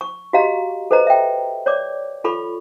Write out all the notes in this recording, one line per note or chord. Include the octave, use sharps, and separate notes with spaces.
C#6
F#4 G4 D#5 F5 A#5
A4 B4 C5 D#5 A#5
E5 G5
C#5 D5 D6
F4 A4 B5 C#6